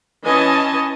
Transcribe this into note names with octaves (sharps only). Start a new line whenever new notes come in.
E3 C#4 D#5 G#5 A5